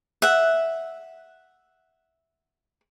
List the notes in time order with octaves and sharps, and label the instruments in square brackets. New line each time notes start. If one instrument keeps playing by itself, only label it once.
[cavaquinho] E5 F#5